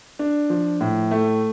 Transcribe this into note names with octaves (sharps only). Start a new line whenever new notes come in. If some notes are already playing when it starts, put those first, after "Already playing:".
D4
F3
A2
A3